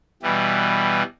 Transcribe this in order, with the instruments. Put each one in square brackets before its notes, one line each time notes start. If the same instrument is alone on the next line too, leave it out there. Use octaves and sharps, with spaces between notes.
[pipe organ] B2 E3 G3